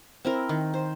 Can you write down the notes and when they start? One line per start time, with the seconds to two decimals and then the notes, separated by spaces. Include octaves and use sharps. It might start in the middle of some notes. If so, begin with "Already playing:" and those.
0.25 C4 E4 A#4
0.49 D#3
0.74 C5